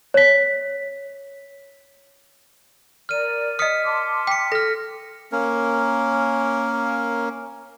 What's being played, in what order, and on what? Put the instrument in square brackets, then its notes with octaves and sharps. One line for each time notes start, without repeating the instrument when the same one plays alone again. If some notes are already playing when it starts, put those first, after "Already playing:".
[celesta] C#5 B6
[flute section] A#4 D5 [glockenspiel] F6 D#7
[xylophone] D#5 D#6 [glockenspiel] F6 B6 C#7
[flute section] A5 C6 D6
[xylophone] G5 [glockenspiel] B6 C#7
[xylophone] A4 [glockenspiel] F6 A#6
[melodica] A#3 C#4 A#4